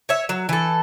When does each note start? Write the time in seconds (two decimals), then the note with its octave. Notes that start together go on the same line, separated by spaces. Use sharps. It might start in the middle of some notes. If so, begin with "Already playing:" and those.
0.09 C#5 E5
0.29 F#3
0.49 E3 A4